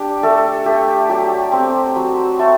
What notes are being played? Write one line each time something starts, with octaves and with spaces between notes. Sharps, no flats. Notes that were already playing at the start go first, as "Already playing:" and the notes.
Already playing: D4 G4
A3 A4
A3 G4
F#3 G4
C4
F#3
A3 A4